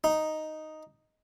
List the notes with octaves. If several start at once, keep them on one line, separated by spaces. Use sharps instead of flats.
D#4